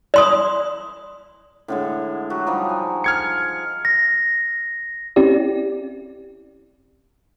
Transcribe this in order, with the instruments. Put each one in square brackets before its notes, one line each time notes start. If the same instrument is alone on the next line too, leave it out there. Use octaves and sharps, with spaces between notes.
[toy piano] D5 C6 D#6
[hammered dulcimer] A2 D3 G#3
F#3 F#4 G4
F3 G3 D#4
G#5
[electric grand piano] F6 G#6 C#7
[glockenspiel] A#6
[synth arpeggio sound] C4 C#4 E4 G4 D5